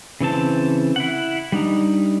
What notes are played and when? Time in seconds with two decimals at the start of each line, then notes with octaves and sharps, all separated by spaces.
0.21 C#3 E3 C4 A5
0.96 E4 F#5
1.52 G3 D4 D#4